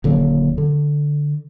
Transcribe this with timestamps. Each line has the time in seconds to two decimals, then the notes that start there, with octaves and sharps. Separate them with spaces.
0.04 D#1 D3 F#3 A#3
0.58 D3